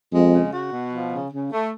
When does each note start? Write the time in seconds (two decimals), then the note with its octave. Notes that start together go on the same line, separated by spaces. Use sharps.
0.13 F2 G#3
0.33 C#3
0.52 F#4
0.72 B2
0.92 F3
1.12 C#3
1.32 C#3
1.52 A3